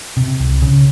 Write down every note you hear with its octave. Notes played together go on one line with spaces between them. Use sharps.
C3
C2
C#3